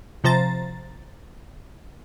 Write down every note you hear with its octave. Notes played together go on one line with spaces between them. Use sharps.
C3 F3 C5 A#5 A6